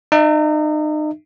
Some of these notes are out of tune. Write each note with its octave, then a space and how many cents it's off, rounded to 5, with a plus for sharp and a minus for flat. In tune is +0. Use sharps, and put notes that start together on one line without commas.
D#4 -35 E5 +0